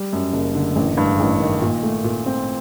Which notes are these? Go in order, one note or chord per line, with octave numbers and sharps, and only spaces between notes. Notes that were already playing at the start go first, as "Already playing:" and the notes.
Already playing: G3
F#2
F#1
D3
A1
G2
A1
D#3
A#2
A3
A#2
C4